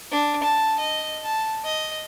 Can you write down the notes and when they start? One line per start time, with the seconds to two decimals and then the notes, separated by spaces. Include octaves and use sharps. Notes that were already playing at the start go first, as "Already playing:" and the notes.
0.11 D4
0.44 A5
0.80 D#5
1.24 A5
1.64 D#5